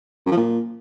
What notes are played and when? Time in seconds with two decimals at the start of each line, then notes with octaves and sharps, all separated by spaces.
0.26 F#2
0.31 F3
0.37 A#2